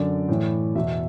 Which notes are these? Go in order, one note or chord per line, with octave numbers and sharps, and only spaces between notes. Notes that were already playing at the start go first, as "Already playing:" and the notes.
Already playing: F#2 D3 D5
A2 E3
E2 B2 E5